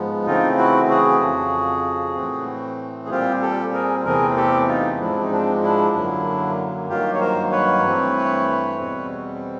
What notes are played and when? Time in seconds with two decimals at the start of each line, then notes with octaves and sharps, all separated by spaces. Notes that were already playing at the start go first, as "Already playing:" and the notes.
Already playing: G#2 F3 G#3 B3
0.26 C#3 E3 A3 C4 D#4 F4
0.58 E4 F#4
0.89 F#4 G#4
1.21 F2 C#3 F3
2.16 A2 E3 A3 C4
3.06 G#4
3.10 A#2 G3 C4 F4 G4
3.42 G4 A4
3.73 G#4 A#4
4.05 E2 C3 E3 A3 C4 G#4 A#4
4.36 G4 A4
4.68 D#4 F4
5.00 G#2 F3 G#3 C4 D4 E4
5.21 D#4
5.31 C4 D4
5.63 D4 E4
5.94 F#2 D3 F#3 A#3
6.89 G2 D#3 F#3 A#3 F4 G4
7.14 C#5
7.20 A#4 C5
7.52 B4 C#5
7.84 G2 E3 A3 C4
8.78 E2 B2 G3 C4